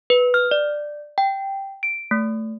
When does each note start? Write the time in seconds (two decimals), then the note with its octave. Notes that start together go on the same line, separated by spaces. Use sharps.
0.10 B4
0.34 F6
0.51 D5
1.18 G5
1.83 D7
2.11 A3